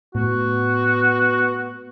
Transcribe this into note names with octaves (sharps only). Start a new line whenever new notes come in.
A2 B3 F#4